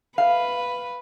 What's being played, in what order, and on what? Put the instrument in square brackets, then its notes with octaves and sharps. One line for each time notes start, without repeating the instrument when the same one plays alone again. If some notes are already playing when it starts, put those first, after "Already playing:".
[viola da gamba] B4 [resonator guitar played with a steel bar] F5